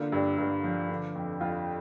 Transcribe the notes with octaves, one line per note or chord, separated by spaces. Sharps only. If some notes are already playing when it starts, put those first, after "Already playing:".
Already playing: D3 A#3 F4
G2 D4
G2
F3
D3
F2
F2 F4